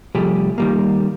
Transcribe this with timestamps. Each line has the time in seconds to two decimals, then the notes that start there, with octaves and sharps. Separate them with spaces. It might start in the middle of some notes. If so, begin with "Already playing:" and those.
0.15 C3 F3 G3 A3 G4 G#4
0.58 D#3 G3 A#3